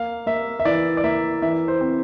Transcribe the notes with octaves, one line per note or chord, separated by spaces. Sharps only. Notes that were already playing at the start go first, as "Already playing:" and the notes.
Already playing: A#3 F5
A#3 E5
E5
E3 D5
D5
A#3 E5
E3 E5
C5
C4